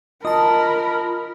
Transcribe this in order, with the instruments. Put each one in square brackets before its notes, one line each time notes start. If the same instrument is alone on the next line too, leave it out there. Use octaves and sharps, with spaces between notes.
[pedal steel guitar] F4 D#6 [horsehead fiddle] A#4 B5 [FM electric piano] D#5 A5